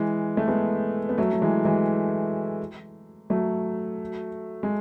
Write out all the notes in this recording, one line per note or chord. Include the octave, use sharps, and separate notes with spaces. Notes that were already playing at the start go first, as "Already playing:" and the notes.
Already playing: E3 G#3
A3
G#3 B3
B3
F#3 A3
F#3
E3 G#3
E3 G#3
F#3 A3
G#3